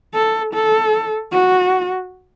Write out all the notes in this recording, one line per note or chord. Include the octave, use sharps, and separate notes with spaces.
A4
A4
F#4